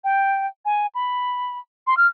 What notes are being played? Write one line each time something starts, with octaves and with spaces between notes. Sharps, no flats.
G5
G#5
B5
C6
F6